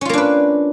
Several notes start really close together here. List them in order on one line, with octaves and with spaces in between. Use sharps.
C#4 F4 A#3 D4 B4